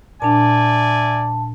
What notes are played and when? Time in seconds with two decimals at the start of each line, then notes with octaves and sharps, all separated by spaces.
0.22 A#2 D4 D5 E5 G#5 A5